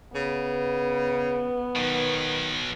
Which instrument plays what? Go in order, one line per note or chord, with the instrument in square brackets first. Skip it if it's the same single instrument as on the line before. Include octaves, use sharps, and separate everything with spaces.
[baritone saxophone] C#3 [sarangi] B3 [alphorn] B4
[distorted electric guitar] B2 F#3 [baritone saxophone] D#3